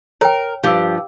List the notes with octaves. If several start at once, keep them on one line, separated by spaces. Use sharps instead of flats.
A#4 C#5 G5
G2 F3 G4 F5 D6 E6